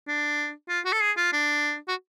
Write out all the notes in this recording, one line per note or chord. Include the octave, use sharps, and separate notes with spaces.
D4
F4
F#4
A4
G#4
F4
D4
F#4